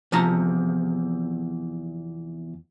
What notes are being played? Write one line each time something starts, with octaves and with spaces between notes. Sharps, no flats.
E2 C3 F3 A5 A#5